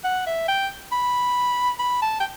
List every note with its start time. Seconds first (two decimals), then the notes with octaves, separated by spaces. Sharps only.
0.04 F#5
0.26 E5
0.48 G5
0.92 B5
1.79 B5
2.02 A5
2.20 G5